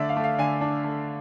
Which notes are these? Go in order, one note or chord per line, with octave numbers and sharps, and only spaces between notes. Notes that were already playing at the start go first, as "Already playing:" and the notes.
Already playing: D3 A3 D5 E5
F5
A3
F5
D3 G#5
D4
A3